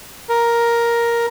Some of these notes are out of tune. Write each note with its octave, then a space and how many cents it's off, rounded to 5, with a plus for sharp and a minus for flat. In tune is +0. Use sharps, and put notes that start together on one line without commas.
A#4 +5